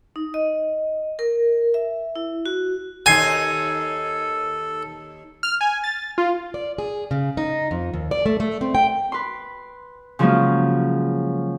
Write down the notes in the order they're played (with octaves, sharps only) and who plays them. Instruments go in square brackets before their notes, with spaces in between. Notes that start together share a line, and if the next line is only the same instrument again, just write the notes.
[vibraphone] D#4
D#5
A#4
E5
E4
F#4
[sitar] D#2 D#4 [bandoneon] A4 [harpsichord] G#5 [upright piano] G#6 C7
[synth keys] F6
G#5
A6
F4
[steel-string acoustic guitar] D5
G#4
C#3
D#4
F2
D#2
D5
A3
A3
C4
G5
[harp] B4 C6
C#3 F3 F#3 G#3 A#3 C#4